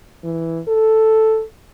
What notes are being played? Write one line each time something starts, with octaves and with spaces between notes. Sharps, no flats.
E3
A4